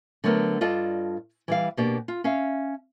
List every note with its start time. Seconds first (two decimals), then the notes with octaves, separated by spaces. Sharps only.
0.24 D3 F#3 A3 B3 A#4
0.61 G2 F4 A4 D5 D#5 A5
1.48 E3 G3 F5
1.77 B2 A#3 D4 G4 D5
2.08 F4
2.24 C#4 E5 F5